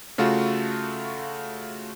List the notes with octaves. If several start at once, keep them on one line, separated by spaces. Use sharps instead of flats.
C#3 A3 F4 F#4